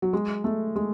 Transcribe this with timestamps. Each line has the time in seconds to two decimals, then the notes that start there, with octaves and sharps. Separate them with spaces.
0.02 F#3
0.13 G#3
0.44 A3
0.76 G#3